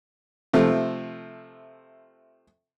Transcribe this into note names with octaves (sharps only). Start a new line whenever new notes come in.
C3 F3 A3